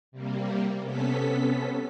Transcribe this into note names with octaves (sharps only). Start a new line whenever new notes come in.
C3 G3 A#3
C3 B3 C#4 A4 B6